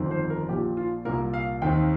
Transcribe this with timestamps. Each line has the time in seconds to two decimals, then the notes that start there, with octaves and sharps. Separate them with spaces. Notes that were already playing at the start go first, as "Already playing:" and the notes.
Already playing: G1 F2 D#3 C4
0.11 C5
0.30 A#4
0.49 A#1 A#2 F3 G4
0.77 F4
1.05 C2 A#2 A#3 A#4
1.34 F5
1.62 D#2 D#3 C4 D#4 G5